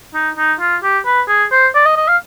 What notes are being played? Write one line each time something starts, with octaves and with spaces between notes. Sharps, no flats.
D#4
D#4
F4
G4
B4
G#4
C5
D5
D#5
D#5
F5